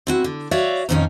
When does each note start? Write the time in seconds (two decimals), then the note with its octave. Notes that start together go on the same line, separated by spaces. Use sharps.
0.07 C4 E4 F#4
0.24 D3
0.51 F#4 C#5 D5 E5 F5
0.89 F2 A#2 D#3 F3 C#4 D#4